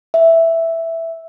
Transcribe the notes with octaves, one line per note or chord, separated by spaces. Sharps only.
E5